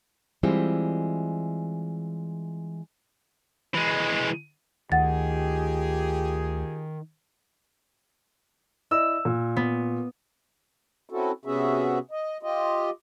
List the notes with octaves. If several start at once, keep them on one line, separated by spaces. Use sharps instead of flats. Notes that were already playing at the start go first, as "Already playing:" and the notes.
E3 G3 G#3 C4 E4 F4
E3 G#3
D2 D#3 F4 G4 G#4 F#5 A6
E4 D5 D#5 E6
A#2
B3
C4 C#4 E4 F#4 A4
C3 B3 C#4 F#4 G#4 E5
D#5
F4 G4 D#5